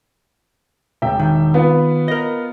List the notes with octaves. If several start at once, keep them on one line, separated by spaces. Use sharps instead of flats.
E1 E5 G5
D#3
B3 F4 B4
A#4 D#5